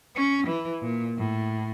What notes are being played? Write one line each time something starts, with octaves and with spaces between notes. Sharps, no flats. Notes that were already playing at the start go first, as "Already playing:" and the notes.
C#4
E3
A#2
A2